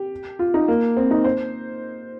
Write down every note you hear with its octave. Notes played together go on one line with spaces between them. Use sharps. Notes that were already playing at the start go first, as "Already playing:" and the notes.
Already playing: G4
F4
D#4
A#3
C4
D#4
C5